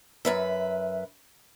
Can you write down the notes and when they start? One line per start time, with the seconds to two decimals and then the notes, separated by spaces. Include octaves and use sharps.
0.25 F#2 B4 E5